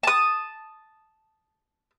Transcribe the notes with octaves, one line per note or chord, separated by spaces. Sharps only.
A5 D#6